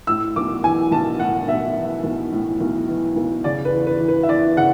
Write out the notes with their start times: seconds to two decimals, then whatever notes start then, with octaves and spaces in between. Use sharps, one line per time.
0.07 A2 E6
0.36 B1 D6
0.63 E3 G#5
0.91 B1 A5
1.20 A2 F#5
1.48 B1 E5
1.77 E3
2.04 B1
2.32 A2
2.60 B1
2.88 E3
3.16 B1
3.44 C#3 D5
3.65 B4
3.73 E2
3.87 B4
4.00 E3
4.08 B4
4.23 E5
4.28 E2 D5
4.57 C#3 F#5